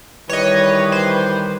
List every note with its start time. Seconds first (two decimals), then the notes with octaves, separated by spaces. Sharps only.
0.29 D#3 E3 G3 B4 C#5 D#5
0.92 C5